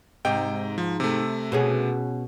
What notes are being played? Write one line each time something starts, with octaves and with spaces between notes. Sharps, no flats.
G#2 C3 D#5 G5
F3
C3 A3
B2 C#4 G#4